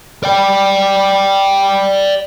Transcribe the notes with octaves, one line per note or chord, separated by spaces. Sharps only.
D5 G5